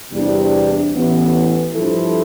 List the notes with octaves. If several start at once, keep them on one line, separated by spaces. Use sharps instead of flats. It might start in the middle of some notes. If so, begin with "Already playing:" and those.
E2 C3 G3 D4
A1 A2 E3 B3
G2 F3 C4 E4 A4